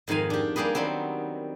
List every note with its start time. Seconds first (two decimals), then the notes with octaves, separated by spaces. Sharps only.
0.08 F2 G#2 D#3 F5 G#5
0.30 D4 G4
0.56 G3 A#3 G4 G#4 B4
0.75 D#3 F#3 G3 B3 C4